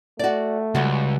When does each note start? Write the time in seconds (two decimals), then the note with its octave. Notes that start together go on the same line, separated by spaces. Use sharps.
0.19 A3 F#4 D5
0.75 C#2 G3 F#4